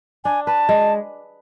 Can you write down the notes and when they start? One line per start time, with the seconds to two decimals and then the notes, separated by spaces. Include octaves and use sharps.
0.24 D4 G#5
0.46 B4 A5
0.69 G#3